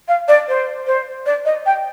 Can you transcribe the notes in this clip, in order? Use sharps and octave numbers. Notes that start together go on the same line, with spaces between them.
F5
D5
C5
C5
D5
D#5
G5